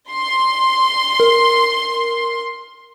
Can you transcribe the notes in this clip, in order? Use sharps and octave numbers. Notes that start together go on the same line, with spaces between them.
C6
A#4